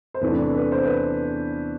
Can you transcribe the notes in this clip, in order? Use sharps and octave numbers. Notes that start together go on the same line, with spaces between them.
C5
E2 C3 E3 A3 D4 B4
B4
C5
B4